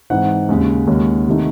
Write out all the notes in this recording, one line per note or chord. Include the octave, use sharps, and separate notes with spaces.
G#2 E3 C4 D#4 F#5
D#2 C#3 G#3
D#2 D#3 G#3 C#4
C3 D#3 A3 D#4